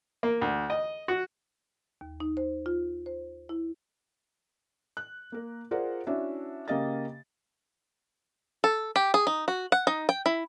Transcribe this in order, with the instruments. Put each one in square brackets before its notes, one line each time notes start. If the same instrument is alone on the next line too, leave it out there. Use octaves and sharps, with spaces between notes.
[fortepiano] A#3
D2
D#5
F#4
[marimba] D#2
D#4
C5
F4
C5
E4
[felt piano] F#6
A#3 A#4
F4 G#4 A#4 C5 D5 F#5
C#4 D4 E4 F#4 E5
C#3 A#3 G4 D#5 F5 A6
[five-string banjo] A4
G4
G#4
D#4
F#4
F#5
D#4
G5
E4